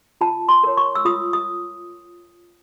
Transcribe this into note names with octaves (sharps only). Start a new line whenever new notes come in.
F4 A5
C6
A#4 C#5
C#6
E6
F4 D#6
D#6